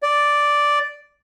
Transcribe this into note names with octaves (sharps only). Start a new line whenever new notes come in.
D5